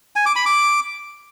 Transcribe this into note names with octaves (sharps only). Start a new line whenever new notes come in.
G#5
D6
B5
D6